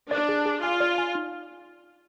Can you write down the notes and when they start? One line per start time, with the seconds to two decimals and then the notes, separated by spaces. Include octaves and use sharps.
0.11 D4 D5
0.29 G#4
0.46 G#4
0.63 F4 G#5
0.80 D5
0.98 G#5
1.15 D#4